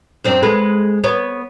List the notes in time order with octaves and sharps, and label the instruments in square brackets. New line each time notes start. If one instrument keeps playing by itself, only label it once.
[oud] F#2 C4 D4
G#3 A4 B4
B3 C#5